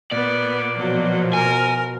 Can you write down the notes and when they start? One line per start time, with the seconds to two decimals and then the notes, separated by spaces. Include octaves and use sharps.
0.12 A#2 B3 D5
0.78 B2 F3 F#3
1.33 A#4 G#5